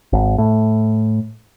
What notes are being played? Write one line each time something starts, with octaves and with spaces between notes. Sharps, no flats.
G#1
A2